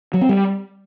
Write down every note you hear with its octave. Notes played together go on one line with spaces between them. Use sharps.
F#3
C4
G3